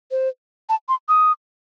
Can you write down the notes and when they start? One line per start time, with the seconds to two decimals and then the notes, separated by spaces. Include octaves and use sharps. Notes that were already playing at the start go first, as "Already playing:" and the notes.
0.11 C5
0.69 A5
0.89 C6
1.09 D#6